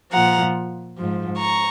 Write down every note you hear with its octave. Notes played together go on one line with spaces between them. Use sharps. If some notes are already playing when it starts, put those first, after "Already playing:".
A#2 F3 F#5 A#5
G#2 F3
A#5 C#6